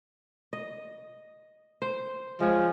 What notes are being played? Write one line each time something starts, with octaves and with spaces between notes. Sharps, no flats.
D#5
C5
F3 G#3 C#4